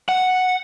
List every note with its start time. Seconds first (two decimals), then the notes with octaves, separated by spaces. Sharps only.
0.09 F#5